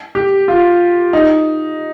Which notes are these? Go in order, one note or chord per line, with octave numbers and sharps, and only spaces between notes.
G4
F4
D#4